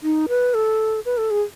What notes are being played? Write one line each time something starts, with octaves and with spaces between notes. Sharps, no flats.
D#4
B4
A4
B4
A4
G#4